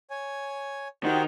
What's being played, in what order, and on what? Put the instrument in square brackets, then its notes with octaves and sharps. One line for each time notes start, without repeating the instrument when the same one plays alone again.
[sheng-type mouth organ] C#5 G#5
[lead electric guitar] D#3 [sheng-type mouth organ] F#4 G4 C5